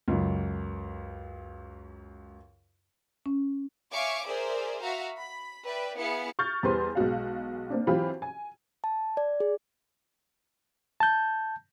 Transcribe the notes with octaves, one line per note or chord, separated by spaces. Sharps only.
C#2 F#2
C#4
C#5 E5 F5 G#5 C#6 D6
G#4 A#4 C5 D5 E5
F#4 E5 F5 A#5
B5
B4 D5 E5 G5
B3 E4 G#4 F5 C#7
C#6 F6 G6 A6
E2 G3 G4 B4 C5 C6
B1 G#3 F#4 F5
A#3 C4 D4
E3 F#3 C4 F4 G4 B5
G#5
A5
D5
G#4
A5 G6